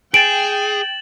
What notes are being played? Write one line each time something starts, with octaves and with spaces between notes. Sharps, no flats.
G#4 G5 A6 D7 E7 F#7